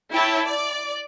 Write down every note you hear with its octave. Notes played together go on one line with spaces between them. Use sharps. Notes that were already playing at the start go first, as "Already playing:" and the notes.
E4 C#5 G5 A5
D5